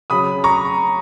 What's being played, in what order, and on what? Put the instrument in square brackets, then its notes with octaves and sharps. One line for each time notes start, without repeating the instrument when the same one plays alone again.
[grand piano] C#3 F#3 B5 D#6
A#5 C#6